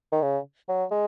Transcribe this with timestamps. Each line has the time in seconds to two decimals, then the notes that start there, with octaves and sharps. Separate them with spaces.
0.12 D#3
0.22 C#3
0.68 F#3
0.91 G#3